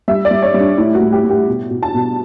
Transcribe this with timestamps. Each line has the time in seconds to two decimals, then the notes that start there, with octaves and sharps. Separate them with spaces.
0.08 G3 E5
0.25 D5
0.31 G3
0.43 C#5
0.54 G3
0.60 D4
0.78 A2 E4
0.95 F#4
1.01 A2
1.12 G4
1.24 A2
1.30 G4
1.47 B2
1.71 B2
1.83 A5
1.94 B2